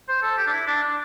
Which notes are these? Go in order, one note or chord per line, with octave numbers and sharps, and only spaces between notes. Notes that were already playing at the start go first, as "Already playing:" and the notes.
C5
A4
G4
D4
E4
D4
D4